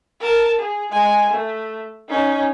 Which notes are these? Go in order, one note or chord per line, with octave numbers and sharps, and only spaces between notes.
A#4 A5
G#4
G#3 G#5
A3
C#4 D#4